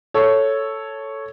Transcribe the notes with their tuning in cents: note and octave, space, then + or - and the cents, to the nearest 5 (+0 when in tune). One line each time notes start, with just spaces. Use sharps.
A4 +0 C#5 +0